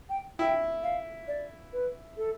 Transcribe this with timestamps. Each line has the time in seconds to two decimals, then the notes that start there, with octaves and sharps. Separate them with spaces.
0.09 G5
0.39 E4 G5
0.83 F5
1.28 D5
1.73 B4
2.17 A4